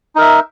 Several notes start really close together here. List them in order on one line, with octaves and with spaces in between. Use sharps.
D#4 A#4 E5